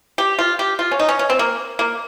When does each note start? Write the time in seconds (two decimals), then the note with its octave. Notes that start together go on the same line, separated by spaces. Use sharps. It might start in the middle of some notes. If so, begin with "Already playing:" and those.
0.18 G4
0.39 F4
0.59 G4
0.79 F4
0.91 C#4
0.99 D#4
1.09 C#4
1.19 C#4
1.30 C4
1.39 A#3
1.79 A#3